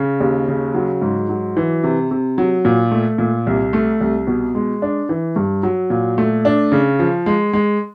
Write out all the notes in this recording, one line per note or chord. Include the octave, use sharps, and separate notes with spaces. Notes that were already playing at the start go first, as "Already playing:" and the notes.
Already playing: C#3
D#2
C#3
F#3
G#2
F#3
E3
C3
C3
F#3
A#2
A3
A#2
C2
A3
C2
B2
G#3
D4
E3
G2
F#3
A#2
A3
D4
C#3
F3
G#3
G#3